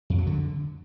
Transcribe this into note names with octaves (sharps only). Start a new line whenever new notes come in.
F2
F#3
D3